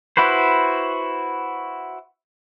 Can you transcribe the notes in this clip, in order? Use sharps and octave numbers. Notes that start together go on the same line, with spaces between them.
E4 F#4 B4 C5